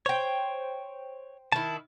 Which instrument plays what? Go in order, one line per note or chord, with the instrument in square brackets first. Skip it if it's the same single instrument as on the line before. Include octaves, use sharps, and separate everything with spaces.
[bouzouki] C5 G5 [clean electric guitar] C#5
[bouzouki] D#3 E4 [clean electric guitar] A5